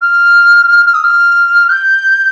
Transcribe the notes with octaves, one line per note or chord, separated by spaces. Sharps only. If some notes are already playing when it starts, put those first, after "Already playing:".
F6
F6
D#6
F6
G6